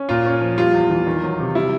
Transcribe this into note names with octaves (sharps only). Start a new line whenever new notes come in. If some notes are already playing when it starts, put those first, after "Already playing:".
Already playing: C#4
A#2 F4
C#4
F3
G3 F4
E2
E3
D#3
F#3
C3
G3 E4